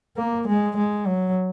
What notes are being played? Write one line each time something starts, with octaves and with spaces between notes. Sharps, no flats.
A#3
G#3
G#3
F#3